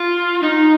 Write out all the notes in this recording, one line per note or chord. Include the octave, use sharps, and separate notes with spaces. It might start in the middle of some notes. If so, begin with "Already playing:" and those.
Already playing: F4
D#4